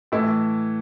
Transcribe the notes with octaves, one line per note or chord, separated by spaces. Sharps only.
A2 E3 A3 E4